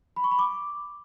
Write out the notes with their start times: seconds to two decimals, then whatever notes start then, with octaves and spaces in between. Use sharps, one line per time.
0.16 B5
0.24 C#6
0.31 B5
0.39 D6